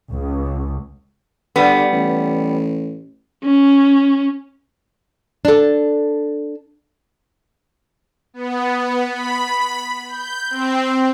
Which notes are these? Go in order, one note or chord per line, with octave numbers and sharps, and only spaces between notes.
C#2
D3 G3 B3
A1
C#4
D4 A4
B3
B5
G6
C4